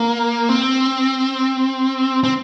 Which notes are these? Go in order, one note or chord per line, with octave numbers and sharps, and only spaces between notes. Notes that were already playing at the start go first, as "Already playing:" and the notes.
Already playing: A#3
C4
C4